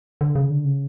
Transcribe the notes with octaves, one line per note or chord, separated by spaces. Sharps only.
D3
C#3
D3
C#3